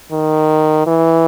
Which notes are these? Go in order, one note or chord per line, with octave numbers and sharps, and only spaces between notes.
D#3
E3